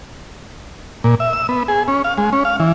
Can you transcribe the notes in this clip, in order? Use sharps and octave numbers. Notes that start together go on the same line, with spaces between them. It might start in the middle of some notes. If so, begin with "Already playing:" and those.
A#2
E5
E6
B3
G#4
C#4
F5
G#3
C#4
F5
E3